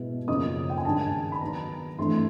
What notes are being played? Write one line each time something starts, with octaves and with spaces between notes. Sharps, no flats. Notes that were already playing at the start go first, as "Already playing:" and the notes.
Already playing: B2 G#3 B3 E4
F#2 C#3 F3 A#3 D#4 D#6
G5
G#5
G2 D#3 G#3 A5
B5
D#3 F#3 B3 A#5
G2 E3 A3 C4 E4 C6